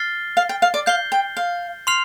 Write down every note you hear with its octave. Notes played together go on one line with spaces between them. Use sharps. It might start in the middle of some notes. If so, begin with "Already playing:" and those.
Already playing: F6 A6 C7 G7
F5
G5
F5
D5
F5 G6 C7 G7
G5
F5
C6 F6 C7 F7